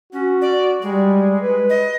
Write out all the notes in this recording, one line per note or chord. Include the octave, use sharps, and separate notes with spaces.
C#4 F#4
D5
G3 G#3
B4
D#5